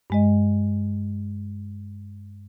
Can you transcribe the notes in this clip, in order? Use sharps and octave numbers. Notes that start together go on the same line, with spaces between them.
G2 G#3 D#5